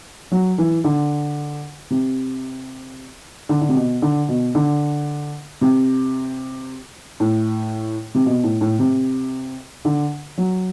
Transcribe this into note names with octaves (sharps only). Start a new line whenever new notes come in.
F#3
E3
D3
C3
D3
D3
C3
B2
D3
B2
D3
C3
A2
C3
B2
A2
A2
C3
D3
F#3